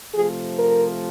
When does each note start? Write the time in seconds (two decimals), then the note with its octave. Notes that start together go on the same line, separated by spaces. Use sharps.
0.15 C3 F3 A3 G#4
0.59 A#4